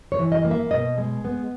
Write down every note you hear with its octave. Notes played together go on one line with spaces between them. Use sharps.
C#5
E3
D#5
A#3
E5
B2 D#5
G#3
B3